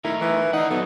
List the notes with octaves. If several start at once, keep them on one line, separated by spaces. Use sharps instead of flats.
A3 D#4 E4 A#4
E3
D#4 D5 F#5
F#3 B3 A4